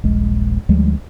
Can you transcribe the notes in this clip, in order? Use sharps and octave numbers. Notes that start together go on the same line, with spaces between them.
D#1 A#1 G#3
D2 F3 G3 G#3